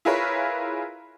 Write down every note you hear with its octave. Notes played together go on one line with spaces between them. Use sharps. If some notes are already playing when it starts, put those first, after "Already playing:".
E4 F4 G#4 A#4 B4 C#5